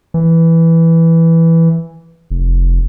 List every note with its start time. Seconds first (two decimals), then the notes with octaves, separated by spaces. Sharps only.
0.14 E3
2.30 F1